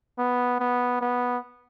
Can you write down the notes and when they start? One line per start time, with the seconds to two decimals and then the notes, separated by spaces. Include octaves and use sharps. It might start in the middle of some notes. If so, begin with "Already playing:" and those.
0.19 B3
0.60 B3
1.01 B3